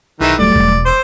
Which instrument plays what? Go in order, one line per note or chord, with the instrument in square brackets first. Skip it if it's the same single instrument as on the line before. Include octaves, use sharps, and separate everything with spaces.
[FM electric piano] B1 D#4 G#4 [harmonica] D#3 E3
[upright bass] D#1 [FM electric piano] F#3 G3 A3 [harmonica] D5
[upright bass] E1 B2
[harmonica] C5 [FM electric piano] C6 D6 E6